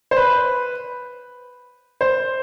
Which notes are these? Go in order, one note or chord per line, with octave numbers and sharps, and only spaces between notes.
C5
B4
C5